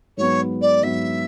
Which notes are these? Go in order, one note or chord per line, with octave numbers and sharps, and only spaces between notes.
G#2 F#3 B3 C#5
D5
G#2 F#3 B3 E5